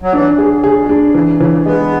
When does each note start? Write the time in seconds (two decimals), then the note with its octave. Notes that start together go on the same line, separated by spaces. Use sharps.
0.02 F#3
0.12 E3 D4
0.38 G#4
0.64 C#3 G#4
0.81 B2
0.89 D4
1.14 C#3 E3
1.40 C#3 E3
1.52 C#3
1.65 G#3 B3